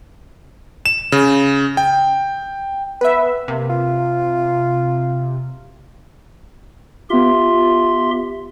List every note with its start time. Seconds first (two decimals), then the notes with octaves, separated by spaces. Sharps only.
0.86 E7
1.12 C#3
1.77 G5
3.01 B3 B4 E5
3.48 C3 A#3
3.69 F4
7.10 B3 F4 G4 E5 C6